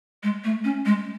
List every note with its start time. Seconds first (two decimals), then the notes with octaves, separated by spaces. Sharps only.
0.23 G#3
0.44 A3
0.64 C#4
0.86 G#3